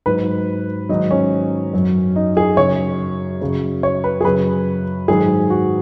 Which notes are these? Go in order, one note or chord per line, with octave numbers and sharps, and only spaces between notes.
G#2 F#3 B4
G#2 D#3 F#3 D#4
C#4
F#2 F#3
D#4
G#4
F#2 C#3 F#3 C#5
F#2 C#3 F#3
C#5
B4
G#4
F#2 C#3 F#3 B4
G#2 D#3 F#3 G#4
F#4